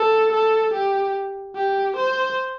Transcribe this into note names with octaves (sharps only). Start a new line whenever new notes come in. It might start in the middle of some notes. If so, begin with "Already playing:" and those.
Already playing: A4
A4
G4
G4
C5